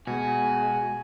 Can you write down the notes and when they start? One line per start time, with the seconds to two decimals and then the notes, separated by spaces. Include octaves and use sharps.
0.07 B2 G#3 F#4 G#5